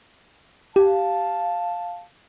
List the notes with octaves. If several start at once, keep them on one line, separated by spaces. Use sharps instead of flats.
G4 F5 A5